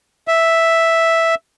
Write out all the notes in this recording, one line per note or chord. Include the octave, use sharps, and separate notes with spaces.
E5